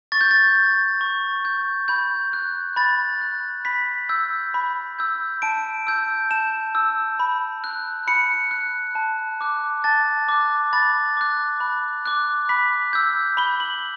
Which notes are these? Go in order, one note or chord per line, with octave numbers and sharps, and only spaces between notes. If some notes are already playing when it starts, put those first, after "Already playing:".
C#6 A6
G6
A6
G6
C#6
G6
B5 G6
F#6
B5 A6
F#6
B5 B6
E6 G6
B5
E6 G6
A5 D7
E6 G6
A5 E7
E6 G6
B5
F#6
B5 C#7
F#6
A5
D6 F#6
A5 A6
D6 F#6
B5 A6
D6 F#6
B5
D6 F#6
B5 B6
E6 G6
B5 G7
F#7